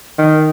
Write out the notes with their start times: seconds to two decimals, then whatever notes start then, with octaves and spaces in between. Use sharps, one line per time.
0.18 D#3